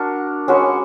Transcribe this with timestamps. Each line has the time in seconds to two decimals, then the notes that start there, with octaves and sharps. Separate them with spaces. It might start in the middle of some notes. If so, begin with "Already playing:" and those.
Already playing: D4 F#4 A#4
0.48 G#3 C#4 F#4 B4